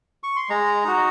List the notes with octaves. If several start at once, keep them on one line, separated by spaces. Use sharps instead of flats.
C#6
C6
G#3 A#5
D#4 F#4